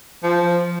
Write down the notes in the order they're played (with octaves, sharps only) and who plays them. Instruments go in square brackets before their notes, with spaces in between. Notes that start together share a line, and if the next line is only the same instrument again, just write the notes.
[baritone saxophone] F3